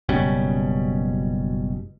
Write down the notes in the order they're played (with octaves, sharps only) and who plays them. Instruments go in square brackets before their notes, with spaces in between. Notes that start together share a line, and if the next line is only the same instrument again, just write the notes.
[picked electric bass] F#1 B2 G3 C#4